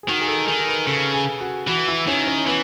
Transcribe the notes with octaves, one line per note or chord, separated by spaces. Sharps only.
G#4
D#3 F#4
G#4
A4
D#3 G#4
B4
C#3 A4
G#4
F#4
E3 F#4
E4
D#3 C#4
C#4
E3 B3